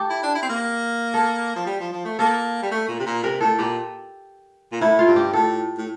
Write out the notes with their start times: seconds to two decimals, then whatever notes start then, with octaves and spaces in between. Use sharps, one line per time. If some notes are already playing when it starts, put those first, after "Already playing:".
Already playing: G4 A4
0.10 E4
0.23 D4
0.35 E4
0.42 C4
0.49 A#3
1.14 A4
1.56 F3
1.66 G3
1.80 F3
1.92 F3
2.05 A3
2.19 A#3 A4
2.62 G3
2.71 A3
2.88 A#2
3.00 C3
3.06 A#2
3.23 C3 A#4
3.40 A2 A4
3.59 A#2 G4
4.72 A#2
4.80 A2 E4
4.99 F4
5.07 G2
5.16 G4
5.33 A2 A4
5.78 A2